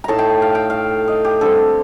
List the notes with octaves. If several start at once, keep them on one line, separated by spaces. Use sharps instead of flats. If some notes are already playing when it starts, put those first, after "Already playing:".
A2 A3 D#4 A5 A#5
G5
F5
G5
F5
D#5
G4
D3 G3 C4 A4